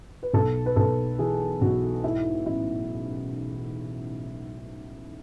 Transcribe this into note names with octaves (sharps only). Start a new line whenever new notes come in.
B4
B1 A4
B4
B1 A4
E3 G#4
B1 F#4
G#2 E4
A1 E4